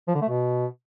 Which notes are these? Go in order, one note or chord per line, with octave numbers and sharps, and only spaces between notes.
F3
D3
A3
B2